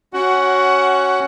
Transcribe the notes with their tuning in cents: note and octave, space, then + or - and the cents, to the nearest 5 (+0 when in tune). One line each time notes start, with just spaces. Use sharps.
C#4 +0 F#4 +10 F#5 +20